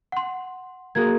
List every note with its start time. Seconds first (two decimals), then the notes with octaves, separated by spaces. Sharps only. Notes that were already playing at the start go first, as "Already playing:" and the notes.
0.12 F#5 C6
0.95 A#3 F#4 G#4 G#6